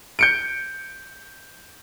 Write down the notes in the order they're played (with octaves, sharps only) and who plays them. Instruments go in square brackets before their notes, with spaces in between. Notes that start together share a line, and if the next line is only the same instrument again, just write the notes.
[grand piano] G6 C#7 D7